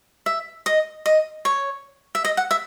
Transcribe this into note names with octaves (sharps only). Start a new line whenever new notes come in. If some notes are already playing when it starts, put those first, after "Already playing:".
E5
D#5
D#5
C#5
E5
D#5
F#5
E5